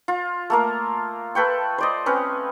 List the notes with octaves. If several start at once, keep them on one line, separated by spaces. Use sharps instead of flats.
F4
A3 A#3 A#4
A4 B4 G5 C#6
C5 D5 D#5
C4 C#4 B4